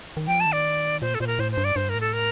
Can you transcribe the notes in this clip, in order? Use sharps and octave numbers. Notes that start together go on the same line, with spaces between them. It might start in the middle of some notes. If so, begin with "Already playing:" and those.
D#3
F3 G5
A5
D#3
D5
A#2 C5
A4
A#2 C5
A#4
A2 C5
C5
G2
D5
G2 C5
A#4
A2
A4
A#4